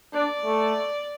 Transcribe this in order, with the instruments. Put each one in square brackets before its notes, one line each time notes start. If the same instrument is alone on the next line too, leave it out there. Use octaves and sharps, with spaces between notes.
[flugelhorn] D4 [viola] D5
[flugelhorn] A3